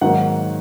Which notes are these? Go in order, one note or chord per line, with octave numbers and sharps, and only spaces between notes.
G#2 D#3 F#3 A#3 F#5